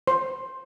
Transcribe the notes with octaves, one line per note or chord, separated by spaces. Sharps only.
C5